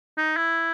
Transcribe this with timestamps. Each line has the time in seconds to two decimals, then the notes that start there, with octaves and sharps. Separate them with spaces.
0.18 D#4
0.37 E4